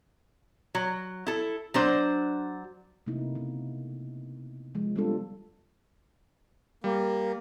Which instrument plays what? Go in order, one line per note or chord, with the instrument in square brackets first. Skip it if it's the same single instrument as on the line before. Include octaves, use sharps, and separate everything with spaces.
[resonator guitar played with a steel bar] F#3
E4 A4
F#3 D4 C5
[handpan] C3 A3 A#3 D#4 E4
C#3 B3
F3 G#3
G3 B3 C4 D4 F4 A4
[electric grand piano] G3 [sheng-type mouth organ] A#3